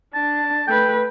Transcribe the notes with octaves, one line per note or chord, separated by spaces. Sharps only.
D4 A5
A3 B4 G5